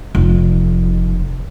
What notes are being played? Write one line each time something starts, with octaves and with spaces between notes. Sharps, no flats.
F1